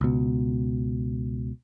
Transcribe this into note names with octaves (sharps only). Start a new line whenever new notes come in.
C#2 B2